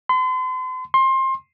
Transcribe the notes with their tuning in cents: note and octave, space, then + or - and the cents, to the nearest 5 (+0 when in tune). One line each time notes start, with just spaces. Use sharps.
C6 -40
C6 +25